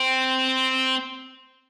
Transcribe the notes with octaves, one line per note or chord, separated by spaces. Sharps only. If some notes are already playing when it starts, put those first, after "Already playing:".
Already playing: C4